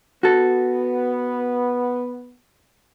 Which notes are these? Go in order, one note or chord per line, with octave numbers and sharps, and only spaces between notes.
B3 F#4 A4